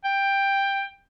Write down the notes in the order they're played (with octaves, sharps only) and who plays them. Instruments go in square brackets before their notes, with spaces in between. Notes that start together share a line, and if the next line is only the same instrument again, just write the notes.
[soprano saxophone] G5